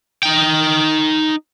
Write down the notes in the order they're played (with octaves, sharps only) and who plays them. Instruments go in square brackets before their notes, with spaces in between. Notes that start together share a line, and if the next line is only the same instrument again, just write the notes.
[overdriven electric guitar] D#4 G5